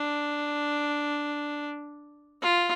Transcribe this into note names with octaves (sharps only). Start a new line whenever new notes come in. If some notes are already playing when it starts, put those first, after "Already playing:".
Already playing: D4
F4